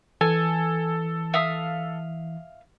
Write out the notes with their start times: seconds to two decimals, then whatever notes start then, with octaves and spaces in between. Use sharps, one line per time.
0.21 E3 A4 G#5
1.34 E5 F5 D#6